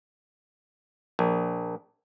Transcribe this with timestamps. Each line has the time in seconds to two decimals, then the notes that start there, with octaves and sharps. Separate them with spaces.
1.19 A#1